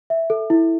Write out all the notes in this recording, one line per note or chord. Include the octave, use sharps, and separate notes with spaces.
E5
A4
E4